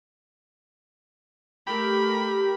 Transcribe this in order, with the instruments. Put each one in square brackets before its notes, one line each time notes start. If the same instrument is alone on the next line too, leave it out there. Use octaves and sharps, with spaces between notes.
[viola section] A3 A#4 [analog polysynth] G4 [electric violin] B5